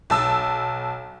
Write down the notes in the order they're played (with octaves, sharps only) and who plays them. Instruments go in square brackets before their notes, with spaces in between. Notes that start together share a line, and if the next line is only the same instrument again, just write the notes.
[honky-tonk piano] B1 A5 E6